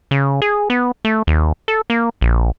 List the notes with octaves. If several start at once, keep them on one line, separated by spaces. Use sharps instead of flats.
C#3
G#4
B3
A3
D#2
A4
A#3
A#1